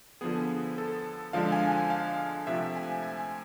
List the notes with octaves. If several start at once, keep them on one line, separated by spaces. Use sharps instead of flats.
D3 F3 B3 G#4
A4
D3 F3 G#3 D4 F5
G#5
G#5
F5
C3 F3 A3 E5
G#5
G#5